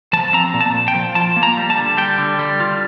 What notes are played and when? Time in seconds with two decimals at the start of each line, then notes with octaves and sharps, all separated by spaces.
0.13 F3 A5
0.33 C4 A#5
0.54 A#2
0.61 A5
0.74 A#2
0.88 G5
0.95 F3
1.15 F4 A5
1.36 A#3
1.43 A#5
1.57 G3
1.70 A5
1.77 D3
1.97 G3 G5
2.18 D3
2.39 G3
2.60 F4